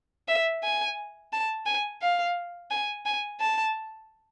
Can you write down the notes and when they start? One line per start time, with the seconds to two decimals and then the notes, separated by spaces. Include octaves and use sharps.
0.28 E5
0.63 G#5
1.33 A5
1.66 G#5
2.02 F5
2.70 G#5
3.06 G#5
3.41 A5